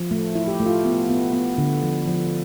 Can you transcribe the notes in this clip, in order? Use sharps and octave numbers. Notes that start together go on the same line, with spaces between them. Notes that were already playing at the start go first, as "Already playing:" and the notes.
Already playing: F3
A3
E4
G4
A3
F4
B3
B3
B3
D3
F3
F3